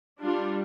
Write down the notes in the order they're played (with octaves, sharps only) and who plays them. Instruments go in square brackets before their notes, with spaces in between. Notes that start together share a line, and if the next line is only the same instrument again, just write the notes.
[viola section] G3 D4 F4